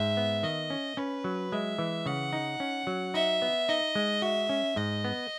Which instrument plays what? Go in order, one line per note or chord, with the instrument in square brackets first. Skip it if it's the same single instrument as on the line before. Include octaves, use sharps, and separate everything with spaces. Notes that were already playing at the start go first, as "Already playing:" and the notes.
Already playing: [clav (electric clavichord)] G#2 [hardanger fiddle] E5
[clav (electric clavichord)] B3
[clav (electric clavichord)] D#3 [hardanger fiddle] D#5
[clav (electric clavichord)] C#4
[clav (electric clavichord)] C#4 [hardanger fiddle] B4
[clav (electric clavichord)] F#3
[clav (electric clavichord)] G#3 [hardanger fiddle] E5
[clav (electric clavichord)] E3
[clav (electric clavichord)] C#3 [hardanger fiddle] F#5
[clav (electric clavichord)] D#4
C#4
F#3
[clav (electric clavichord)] D#4 [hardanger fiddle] E5
[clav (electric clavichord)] B3
[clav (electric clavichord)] D#4 [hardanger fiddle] D#5
[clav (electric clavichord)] G#3
[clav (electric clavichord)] F#4 [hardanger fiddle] E5
[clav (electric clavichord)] C#4
[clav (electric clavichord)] G#2 [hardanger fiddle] D#5
[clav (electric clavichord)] B3